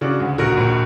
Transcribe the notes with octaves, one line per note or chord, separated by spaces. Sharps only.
C#3 D4 F#4
D2
A#1 F#4 A#4
A#1